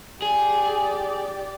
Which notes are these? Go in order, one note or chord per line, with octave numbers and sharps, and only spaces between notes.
G4 G#4 D5